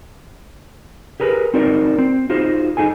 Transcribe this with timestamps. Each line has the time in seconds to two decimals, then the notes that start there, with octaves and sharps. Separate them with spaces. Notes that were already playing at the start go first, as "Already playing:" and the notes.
1.20 G4 G#4 A#4 B4
1.54 C4 D#4 F#4 A#4 D5
1.98 C4
2.30 D#4 F4 F#4 G#4 C5
2.77 D#4 G#4 A4 G#5